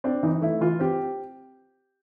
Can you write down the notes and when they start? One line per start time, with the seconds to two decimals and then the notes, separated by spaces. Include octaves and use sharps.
0.04 C4 D4
0.23 E3 D#4
0.42 A3 E4
0.61 E3 F4
0.80 C4 G4